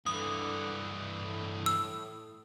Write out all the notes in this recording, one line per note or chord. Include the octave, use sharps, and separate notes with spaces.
G2 D3 E3 D#6
A2
E6